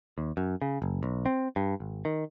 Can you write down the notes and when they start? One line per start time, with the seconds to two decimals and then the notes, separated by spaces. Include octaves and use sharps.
0.18 D#2
0.37 F#2
0.62 C#3
0.82 F#1
1.03 B1
1.26 C4
1.56 G2
1.80 G#1
2.05 D#3